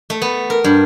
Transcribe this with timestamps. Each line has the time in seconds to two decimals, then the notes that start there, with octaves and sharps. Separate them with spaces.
0.10 A3
0.22 B3
0.50 A#4
0.64 G2